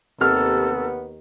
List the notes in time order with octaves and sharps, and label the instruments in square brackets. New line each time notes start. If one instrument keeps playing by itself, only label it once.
[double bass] D#2 [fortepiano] C3 F6 [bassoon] B3 [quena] A4